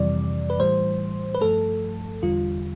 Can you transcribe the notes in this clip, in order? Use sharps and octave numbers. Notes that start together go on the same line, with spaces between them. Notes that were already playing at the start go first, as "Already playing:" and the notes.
Already playing: F2 C3 E3 G3 D5
B4
A2 E3 G3 C5
B4
G2 F3 A3 A4
E2 D3 G3 F4